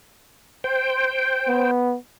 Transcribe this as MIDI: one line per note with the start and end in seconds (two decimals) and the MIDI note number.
0.64 1.71 72
0.64 1.71 79
1.48 1.96 59